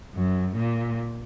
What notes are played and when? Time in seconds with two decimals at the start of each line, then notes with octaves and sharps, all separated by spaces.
0.14 F#2
0.56 A#2